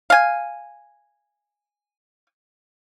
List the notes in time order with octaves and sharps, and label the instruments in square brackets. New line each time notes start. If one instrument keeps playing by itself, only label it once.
[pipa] F5 G#5